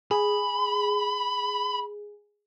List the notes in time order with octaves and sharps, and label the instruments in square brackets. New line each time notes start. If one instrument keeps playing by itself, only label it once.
[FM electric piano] G#4 [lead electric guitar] B5